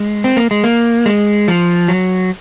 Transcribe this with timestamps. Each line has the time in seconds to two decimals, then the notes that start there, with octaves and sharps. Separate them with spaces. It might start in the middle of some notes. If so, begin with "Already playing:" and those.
Already playing: G#3
0.24 C4
0.37 A#3
0.51 G#3
0.64 A#3
1.06 G#3
1.48 F3
1.88 F#3